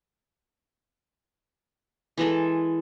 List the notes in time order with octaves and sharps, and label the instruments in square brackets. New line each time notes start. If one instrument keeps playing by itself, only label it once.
[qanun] E3 G#3 A4